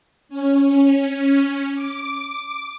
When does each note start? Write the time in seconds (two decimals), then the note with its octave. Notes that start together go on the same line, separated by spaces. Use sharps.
0.29 C#4
1.75 D6